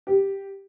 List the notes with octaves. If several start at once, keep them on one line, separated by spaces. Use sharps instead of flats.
G4